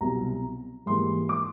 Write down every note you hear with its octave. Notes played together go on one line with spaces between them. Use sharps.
C2 B2 F#3 A#5
G#2 E3 G3 A#3 C6
D6